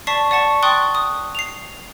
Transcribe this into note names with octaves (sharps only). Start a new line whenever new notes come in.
D5 A5 C#6 B6 C7
D5 F#5 A5 C#6
G5 C6 C#6 D#6 F#6 A6
D#6
C7 F7